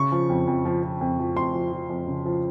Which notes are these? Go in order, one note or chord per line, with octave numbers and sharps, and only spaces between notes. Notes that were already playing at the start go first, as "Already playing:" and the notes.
Already playing: C#3 C#6
F3
F2
F2
F3
F3
F2
F3
F2 C6
F3
F3
F2
C#3
F3